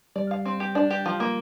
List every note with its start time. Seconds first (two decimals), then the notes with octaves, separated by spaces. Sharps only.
0.16 G3 D5
0.31 F5
0.45 C4
0.60 G4
0.75 D4
0.90 G4
1.06 F3
1.20 A#3